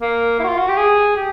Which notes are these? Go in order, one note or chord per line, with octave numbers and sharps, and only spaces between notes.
A#3
E4
F#4
F4
F#4
G4
G#4
G4